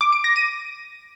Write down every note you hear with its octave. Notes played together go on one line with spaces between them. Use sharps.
D6
D7
A#6
D#7